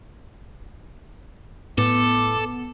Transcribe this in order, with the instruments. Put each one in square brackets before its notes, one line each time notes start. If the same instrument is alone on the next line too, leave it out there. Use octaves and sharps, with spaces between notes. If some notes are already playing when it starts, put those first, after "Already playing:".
[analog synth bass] A2 [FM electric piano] B3 [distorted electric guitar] A4 [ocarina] D6